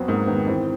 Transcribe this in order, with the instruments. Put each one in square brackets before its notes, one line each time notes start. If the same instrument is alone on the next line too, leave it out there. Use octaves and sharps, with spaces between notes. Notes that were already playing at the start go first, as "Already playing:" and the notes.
Already playing: [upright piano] F2 F#3 B3 [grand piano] C4
[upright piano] G#2 [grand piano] A#3
[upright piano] D#3 [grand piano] B3
[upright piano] E3 [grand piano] C4